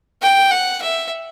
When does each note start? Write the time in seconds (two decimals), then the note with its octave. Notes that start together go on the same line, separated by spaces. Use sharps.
0.22 G5
0.51 F#5
0.82 E5